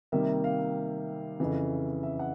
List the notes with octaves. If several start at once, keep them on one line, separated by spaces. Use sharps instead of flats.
C3 D#3 G3 A#3 E5
F5
F2 C#3 E3
E5
F#5